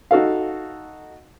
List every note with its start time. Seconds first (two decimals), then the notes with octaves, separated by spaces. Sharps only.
0.11 D#4 F#4 A4 F5